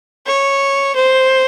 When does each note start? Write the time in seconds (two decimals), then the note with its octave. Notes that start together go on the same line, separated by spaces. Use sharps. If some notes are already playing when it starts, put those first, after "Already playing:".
0.27 C#5
0.96 C5